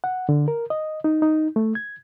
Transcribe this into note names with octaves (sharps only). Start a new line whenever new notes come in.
F#5
D3
A#4
D#5
D#4
D#4
A3
G#6